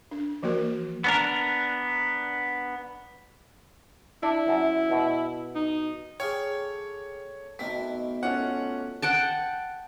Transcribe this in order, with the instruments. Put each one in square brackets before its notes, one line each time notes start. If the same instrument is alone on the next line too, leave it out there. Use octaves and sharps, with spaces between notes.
[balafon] D4
E3 F3 A#3 F#4 A#4
[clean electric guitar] B3 D4 A#4
[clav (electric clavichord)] D4 [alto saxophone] E4
[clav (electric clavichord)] F#2
B2
[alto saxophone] D#4
[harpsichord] G#4 F5 G5 [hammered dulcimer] A4 D5 [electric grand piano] C#5
[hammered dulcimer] B2 D#3 A3 [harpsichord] A#3 C4 C5 [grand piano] B6
[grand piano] C#4 F4 A4 [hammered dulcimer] D5 [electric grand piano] F#5
[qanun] F#5 G5 A5